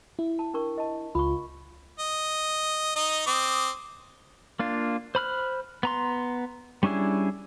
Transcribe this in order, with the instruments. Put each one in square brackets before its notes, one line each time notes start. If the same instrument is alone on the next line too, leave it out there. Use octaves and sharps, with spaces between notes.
[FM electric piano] E4
[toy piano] A5
D4 A#4 C#6
D#5 A5
[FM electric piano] C#2 F4 [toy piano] B5 C#6
[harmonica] D#5
D#4 D#5
C4 D6 D#6
[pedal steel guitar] A#3 D4 F4
C5 B5 F6 F#6
B3 A#5 C6
G3 C#4 D4 E4 G#4